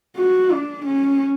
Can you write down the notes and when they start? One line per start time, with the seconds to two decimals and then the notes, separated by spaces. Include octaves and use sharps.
0.17 F#4
0.52 D4
0.86 C#4